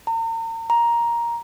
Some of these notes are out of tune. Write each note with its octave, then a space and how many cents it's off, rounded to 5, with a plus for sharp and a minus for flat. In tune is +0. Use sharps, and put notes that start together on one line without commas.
A#5 -40
A#5 +10